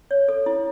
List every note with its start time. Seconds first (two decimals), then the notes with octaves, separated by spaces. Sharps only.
0.11 C#5
0.28 A4
0.46 E4